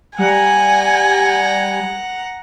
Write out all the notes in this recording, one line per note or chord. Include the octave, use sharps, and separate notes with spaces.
G3 F#5 G#5 A#5